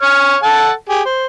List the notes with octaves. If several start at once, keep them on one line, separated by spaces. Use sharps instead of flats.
C#5 F6
A4 F#5 A5
G4 G#4
C5